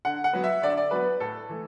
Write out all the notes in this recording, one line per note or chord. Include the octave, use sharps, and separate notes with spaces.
D3 F#5
F#5
F#3 B3
E5
D3 D5
E5
D5
F#3 B3 B4
A2 A4
E3 A3